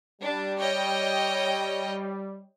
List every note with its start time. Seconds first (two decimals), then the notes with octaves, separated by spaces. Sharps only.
0.22 G3 D4
0.59 C#5 D#5 G5